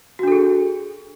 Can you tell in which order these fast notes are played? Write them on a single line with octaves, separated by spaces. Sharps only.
F#4 D4 A4 G#4